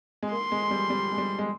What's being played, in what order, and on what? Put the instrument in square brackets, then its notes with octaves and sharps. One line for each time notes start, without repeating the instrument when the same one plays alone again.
[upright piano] G#3
[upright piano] A#3 [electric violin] C6
[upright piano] G#3
G3
G3
G#3
G3
G#3